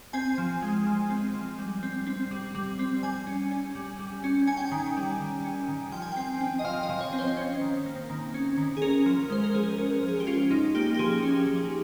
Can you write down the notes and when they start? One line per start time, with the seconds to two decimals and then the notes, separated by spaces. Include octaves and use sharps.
0.13 C4 G#5
0.38 F3
0.62 G#3
0.87 F3
1.10 C4
1.34 F3
1.58 G3
1.83 C4
2.07 C4
2.31 G3
2.55 G3
2.79 C4
3.03 G3 G#5
3.27 C#4
3.51 C#4
3.75 G3
3.99 G3
4.24 C#4
4.47 C#4 G#5
4.57 G5
4.66 G#5
4.72 D#3
4.97 G3
5.20 D#3
5.44 C#4
5.68 D#3
5.92 F3 G5
6.02 G#5
6.12 C4 G5
6.41 C4
6.59 D#5
6.65 F3 F5
6.83 D#5
6.89 F3
7.01 C#5
7.13 C4
7.19 C5
7.37 C#4
7.61 D#3
7.86 A#3
8.10 D#3
8.34 C#4
8.57 D#3
8.77 G#4
8.82 C#4 A#4
9.06 F3
9.30 G#3 C5
9.44 A#4
9.54 F3 G#4
9.73 A#4
9.78 C#4
9.90 A#4
10.03 F3
10.08 G#4
10.20 G4
10.27 C#4 F4
10.51 F3 D#4
10.75 A#3 G4
10.94 G4
10.99 F3 G#4
11.23 C#4
11.47 F3